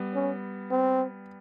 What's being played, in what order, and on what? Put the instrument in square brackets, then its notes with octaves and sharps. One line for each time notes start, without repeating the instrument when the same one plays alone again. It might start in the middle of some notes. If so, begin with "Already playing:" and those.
Already playing: [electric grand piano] G3 B3
[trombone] C#4
C4